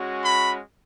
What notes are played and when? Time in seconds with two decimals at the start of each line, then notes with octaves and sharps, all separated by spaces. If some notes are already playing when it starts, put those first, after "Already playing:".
Already playing: G#3 C#4 F#4
0.24 B5